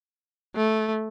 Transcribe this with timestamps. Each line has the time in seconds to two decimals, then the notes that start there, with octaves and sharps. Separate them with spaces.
0.56 A3